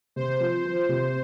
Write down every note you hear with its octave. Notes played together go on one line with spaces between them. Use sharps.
C3 C5
F3
F3
C3